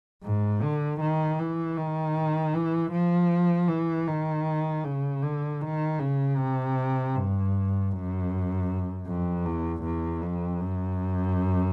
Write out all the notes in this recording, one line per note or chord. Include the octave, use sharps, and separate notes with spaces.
G#2
D3
D#3
E3
D#3
E3
F3
E3
D#3
C#3
D3
D#3
C#3
C3
G2
F#2
F2
E2
E2
F2
F#2